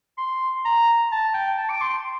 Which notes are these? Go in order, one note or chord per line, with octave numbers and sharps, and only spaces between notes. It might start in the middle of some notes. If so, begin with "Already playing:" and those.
C6
A#5
A5
G5
A5
D6
C6